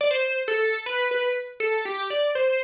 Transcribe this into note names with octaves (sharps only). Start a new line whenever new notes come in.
D5
C5
A4
B4
B4
A4
G4
D5
C5